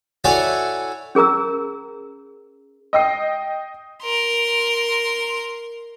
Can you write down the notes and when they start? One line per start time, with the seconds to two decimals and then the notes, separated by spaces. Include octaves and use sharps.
0.24 E4 F#4 A4 C#5 D5 G#5
1.15 C#4 G#4 A#4 A#5 E6
2.93 D#5 G5 D#6 C7
4.03 A#4 C6